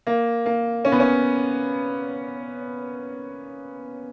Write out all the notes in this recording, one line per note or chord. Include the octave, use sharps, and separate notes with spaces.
A#3
A#3
C#4
B3
C#4